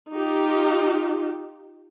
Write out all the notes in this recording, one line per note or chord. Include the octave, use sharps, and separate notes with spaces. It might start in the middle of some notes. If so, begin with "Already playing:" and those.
D#4 F4 G4